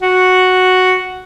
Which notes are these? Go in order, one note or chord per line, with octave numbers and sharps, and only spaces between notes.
F#4